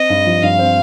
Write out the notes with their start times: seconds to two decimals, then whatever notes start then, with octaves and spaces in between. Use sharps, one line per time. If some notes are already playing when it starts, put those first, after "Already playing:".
Already playing: C4 D#5
0.10 G2
0.26 F3
0.43 G2 F5
0.59 C4